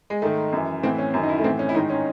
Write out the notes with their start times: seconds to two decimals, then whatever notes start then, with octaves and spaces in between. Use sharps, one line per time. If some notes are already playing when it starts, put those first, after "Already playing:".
0.10 G#3
0.22 G#2 D#3 A3
0.53 F#2 E3
0.83 A2 E3 C4
0.98 C#4
1.14 F#2 D#3
1.23 D#4
1.29 E4
1.39 A3
1.44 A2 E3 C4
1.59 C#4
1.69 E4
1.75 G#2 D#3 D#4
1.90 C#4